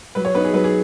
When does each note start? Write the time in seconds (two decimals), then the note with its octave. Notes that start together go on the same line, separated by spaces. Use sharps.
0.15 F#3 B4
0.25 C#5
0.35 B3 D#4 B4
0.44 G#4
0.53 F#3 B4
0.64 G#4